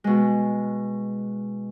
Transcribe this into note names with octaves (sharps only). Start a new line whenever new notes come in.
B2 G#3